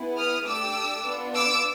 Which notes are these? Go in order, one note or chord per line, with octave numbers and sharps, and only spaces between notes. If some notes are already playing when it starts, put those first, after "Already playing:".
Already playing: B3 E4 G#4
D#6 F6
A3 D4 G4 D6 E6
B3 D4 F4
D6 E6